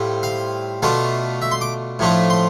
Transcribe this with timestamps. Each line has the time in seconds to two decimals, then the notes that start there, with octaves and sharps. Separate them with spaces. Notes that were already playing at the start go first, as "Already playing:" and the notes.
Already playing: A2 G3 C4 F4
0.23 F5
0.82 B2 A3 D4 F4 F5
1.42 E5
1.51 C6
1.61 D6
1.99 A2 F3 A3 D4 F4
2.30 C6